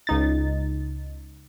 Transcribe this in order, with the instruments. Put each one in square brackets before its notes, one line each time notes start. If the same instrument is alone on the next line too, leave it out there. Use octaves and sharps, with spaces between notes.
[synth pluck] C#2 D#4 A6